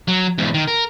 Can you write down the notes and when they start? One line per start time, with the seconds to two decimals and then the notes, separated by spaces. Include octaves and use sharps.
0.08 F#3
0.38 E2 G#2
0.54 D#3
0.67 A#4